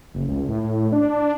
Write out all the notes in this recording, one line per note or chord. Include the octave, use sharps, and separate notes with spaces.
F#1
C#2
A2
D4